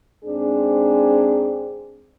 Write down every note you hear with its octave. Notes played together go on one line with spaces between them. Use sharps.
G#2 C4 D4 G#4